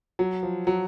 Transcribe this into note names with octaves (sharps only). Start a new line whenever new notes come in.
F#3
F3
F#3